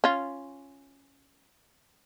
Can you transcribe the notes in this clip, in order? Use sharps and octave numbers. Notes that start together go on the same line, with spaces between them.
C#4 F4